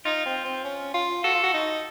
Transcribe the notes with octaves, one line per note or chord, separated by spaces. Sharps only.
D#4 F4
C4
C4
C#4
F4
F#4 A4
F4
F#4
D#4